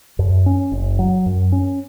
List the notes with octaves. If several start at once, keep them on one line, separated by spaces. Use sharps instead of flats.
F#2
C#4
F#1
F#3
F#2
C#4